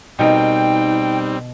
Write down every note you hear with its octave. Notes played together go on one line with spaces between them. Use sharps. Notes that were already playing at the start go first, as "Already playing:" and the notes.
B2 G3 C4 D#4 A#4 G5